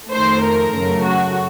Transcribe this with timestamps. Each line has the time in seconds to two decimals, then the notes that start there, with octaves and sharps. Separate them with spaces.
0.12 F2 D#3 A3 C5
0.43 A#4
0.74 F#2 C#3 F#3 A3
1.04 F#4